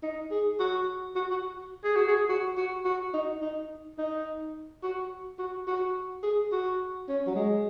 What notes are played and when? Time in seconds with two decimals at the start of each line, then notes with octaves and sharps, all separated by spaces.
0.03 D#4
0.31 G#4
0.60 F#4
1.16 F#4
1.31 F#4
1.84 G#4
1.96 F#4
2.08 G#4
2.29 F#4
2.57 F#4
2.85 F#4
3.14 D#4
3.42 D#4
3.99 D#4
4.83 F#4
5.39 F#4
5.67 F#4
6.23 G#4
6.52 F#4
7.09 C#4
7.27 F#3
7.36 G#3